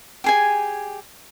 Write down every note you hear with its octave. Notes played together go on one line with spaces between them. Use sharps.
G4 G#4 G#5